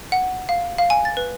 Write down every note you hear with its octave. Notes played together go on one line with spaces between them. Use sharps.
F#5
F5
F5
G#5
A6
B4